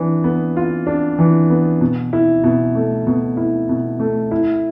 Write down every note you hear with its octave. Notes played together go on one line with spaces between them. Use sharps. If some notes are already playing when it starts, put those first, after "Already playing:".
Already playing: E3 D4
B3
F4
D4
E3
B3
B2
E4
B2
A3
B2
E4
B2
A3
E4